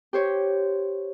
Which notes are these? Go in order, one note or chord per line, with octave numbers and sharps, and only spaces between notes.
G4 C5 C#5